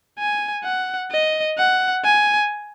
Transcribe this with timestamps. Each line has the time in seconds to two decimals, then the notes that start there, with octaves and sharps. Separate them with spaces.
0.19 G#5
0.64 F#5
1.11 D#5
1.58 F#5
2.04 G#5